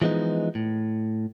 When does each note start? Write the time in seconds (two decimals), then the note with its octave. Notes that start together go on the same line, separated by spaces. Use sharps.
0.02 E3 F3 G#3 B3 D#4
0.55 A2